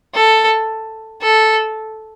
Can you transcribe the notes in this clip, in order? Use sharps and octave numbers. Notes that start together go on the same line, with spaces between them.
A4
A4